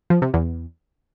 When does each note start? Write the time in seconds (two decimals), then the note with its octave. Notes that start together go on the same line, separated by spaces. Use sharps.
0.10 F3
0.22 C3
0.34 E2